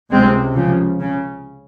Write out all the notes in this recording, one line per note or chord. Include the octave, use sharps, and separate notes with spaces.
C#2 C3 G#3 C4
C#3 F3
C#3